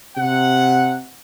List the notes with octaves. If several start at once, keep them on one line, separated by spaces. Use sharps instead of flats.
C3 F#5